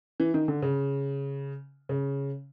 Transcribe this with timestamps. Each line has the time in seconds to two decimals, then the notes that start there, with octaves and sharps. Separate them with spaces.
0.20 E3
0.34 D#3
0.48 D3
0.62 C#3
1.89 C#3